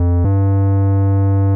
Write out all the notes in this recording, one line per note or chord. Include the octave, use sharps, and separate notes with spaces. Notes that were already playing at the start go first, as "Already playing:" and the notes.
Already playing: F2
G2